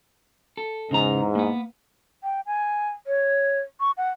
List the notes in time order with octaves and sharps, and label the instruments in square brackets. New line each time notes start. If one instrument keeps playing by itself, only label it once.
[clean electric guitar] A4
[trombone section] E2 G#2 [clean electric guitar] C#3 A#5
[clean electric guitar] A#3 B3
[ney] G5
G#5
C#5
C#6
F#5